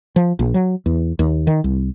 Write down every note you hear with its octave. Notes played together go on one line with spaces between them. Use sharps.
F3
A#1
F#3
E2
D#2
D#3
C2